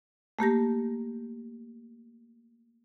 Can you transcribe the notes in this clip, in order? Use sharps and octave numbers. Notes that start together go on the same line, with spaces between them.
A3 A#3 G4 A#6